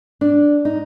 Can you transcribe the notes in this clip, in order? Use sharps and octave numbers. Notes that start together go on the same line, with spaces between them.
D4
D#4